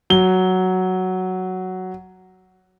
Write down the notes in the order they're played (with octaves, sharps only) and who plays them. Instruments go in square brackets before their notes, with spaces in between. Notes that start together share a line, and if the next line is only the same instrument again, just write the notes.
[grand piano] F#3 G7